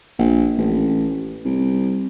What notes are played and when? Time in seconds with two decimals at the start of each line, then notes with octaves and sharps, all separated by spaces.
0.19 A#1
0.58 A1
1.45 C2